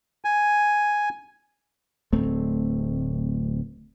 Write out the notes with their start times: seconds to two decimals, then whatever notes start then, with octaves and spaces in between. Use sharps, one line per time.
0.25 G#5
2.12 D1 A3 C4